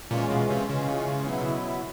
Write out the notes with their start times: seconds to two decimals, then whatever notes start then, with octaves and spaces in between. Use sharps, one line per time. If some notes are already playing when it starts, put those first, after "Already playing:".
0.10 A#2 E3 G#3 C#4 F4
0.30 B2
0.50 C3
0.69 C#3 E3 G#3 C#4 F4
1.27 B2 F#3 B3 E4